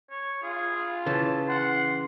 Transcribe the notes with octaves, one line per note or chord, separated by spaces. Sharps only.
C#5
F4 G#4
C#3 E3 A5
F#5 C6